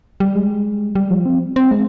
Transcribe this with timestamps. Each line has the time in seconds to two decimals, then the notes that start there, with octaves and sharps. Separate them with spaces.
0.20 G3
0.35 G#3
0.95 G3
1.10 F3
1.26 C4
1.56 C4
1.71 G#3